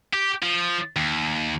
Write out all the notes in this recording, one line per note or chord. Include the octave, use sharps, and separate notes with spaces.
G4
F3
D#2